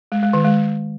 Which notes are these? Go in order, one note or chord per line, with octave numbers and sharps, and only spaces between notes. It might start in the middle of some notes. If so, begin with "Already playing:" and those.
G#3
G#3
D#3
G#3